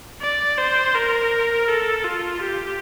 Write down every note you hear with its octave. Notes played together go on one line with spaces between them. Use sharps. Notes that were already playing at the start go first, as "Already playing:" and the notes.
D5
C5
A#4
A4
F4
G4